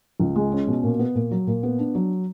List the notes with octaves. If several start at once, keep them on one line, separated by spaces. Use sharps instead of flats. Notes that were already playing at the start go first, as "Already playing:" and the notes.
C#2
G#3
C#4
B2
A#2
B3
A#2
F#3
A#2
B3
D4
F#3